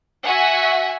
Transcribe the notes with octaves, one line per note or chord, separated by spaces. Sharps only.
F#4 E5 F#5 G#5